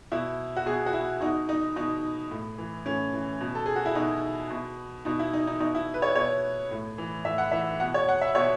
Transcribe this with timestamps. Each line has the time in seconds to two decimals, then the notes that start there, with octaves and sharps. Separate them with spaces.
0.12 B2 E4
0.56 F#4
0.66 B2 G#4
0.86 F#4
0.93 E4
1.21 B2 D#4
1.49 D#4
1.76 B2 D#4
2.31 A2
2.58 E3
2.86 A2 C#4
3.13 E3
3.41 B2
3.55 A4
3.66 G#4
3.76 F#4
3.86 E4
3.95 B2 D#4
4.50 B2
5.05 B2 D#4
5.19 E4
5.33 D#4
5.47 D#4
5.60 B2 D#4
5.75 E4
5.94 B4
6.02 C#5
6.15 B2 C#5
6.71 A2
6.98 E3
7.25 A2 E5
7.38 F#5
7.52 E3 E5
7.80 B2 F#5
7.94 C#5
8.09 F#5
8.21 E5
8.35 B2 C#5